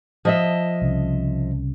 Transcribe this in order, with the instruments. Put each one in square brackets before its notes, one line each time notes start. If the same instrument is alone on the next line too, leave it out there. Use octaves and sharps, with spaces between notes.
[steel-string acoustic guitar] F3 D#5 E5
[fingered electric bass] C2 C#3